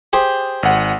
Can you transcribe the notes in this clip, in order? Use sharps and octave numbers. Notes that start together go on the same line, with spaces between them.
G4 G#4 C5
G#1 F#5